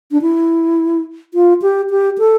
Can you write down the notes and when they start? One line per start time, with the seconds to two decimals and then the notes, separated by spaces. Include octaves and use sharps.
0.12 D4
0.22 E4
1.34 F4
1.62 G4
1.90 G4
2.18 A4